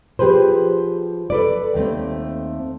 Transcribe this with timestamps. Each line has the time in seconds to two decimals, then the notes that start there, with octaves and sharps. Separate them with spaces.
0.19 F3 G4 G#4 B4 C5
1.30 A4 B4 D5
1.75 D#2 A3 C4